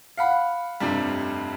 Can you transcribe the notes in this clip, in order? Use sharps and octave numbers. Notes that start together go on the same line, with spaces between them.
F5 F#5 B5
F1 G2 C3 G3